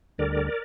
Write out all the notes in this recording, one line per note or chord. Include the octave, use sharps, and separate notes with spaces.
D2 D3 G3 A#4 D5